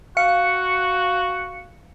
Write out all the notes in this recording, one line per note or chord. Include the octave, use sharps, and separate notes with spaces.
F#4 F5 C#7